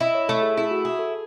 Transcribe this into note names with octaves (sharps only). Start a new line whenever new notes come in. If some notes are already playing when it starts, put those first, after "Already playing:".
E4 D#5
C#5
A3 A4
G#4
E4 G#4
F#4
G#4
A4